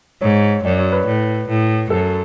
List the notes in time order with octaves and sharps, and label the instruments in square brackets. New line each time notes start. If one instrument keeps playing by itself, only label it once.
[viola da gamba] G#2 [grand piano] C#5
[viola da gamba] F#2 [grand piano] D5
[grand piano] C#5
B4
[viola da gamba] A2
A2
[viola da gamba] F#2 [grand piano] A4